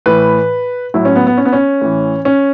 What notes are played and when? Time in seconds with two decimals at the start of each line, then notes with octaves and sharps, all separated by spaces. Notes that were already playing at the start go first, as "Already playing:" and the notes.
0.06 A2 E3 B4
0.94 A2 F#3 E4
1.05 C#4
1.16 B3
1.27 B3
1.38 C#4
1.45 B3
1.53 C#4
1.82 A2 E3
2.25 C#4